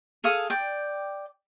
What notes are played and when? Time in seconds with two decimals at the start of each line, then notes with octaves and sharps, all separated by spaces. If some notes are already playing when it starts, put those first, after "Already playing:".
0.24 G#4 A4 F5 D#6
0.50 D5 G5